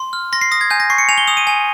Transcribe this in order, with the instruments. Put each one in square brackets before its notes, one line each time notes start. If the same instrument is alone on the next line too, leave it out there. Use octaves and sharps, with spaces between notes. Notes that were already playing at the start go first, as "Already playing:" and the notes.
Already playing: [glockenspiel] C6
F6
C6 A#6
C7
D#6 A#6
G#6
G#5 G6
A#6
C#6 C7
C#7
G#5 F7
G7
D#6 F7
D#7
G#5